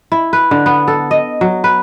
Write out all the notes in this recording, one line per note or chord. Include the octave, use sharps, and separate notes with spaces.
E4
B4
D3
B3
A4
D#5
F#3
B4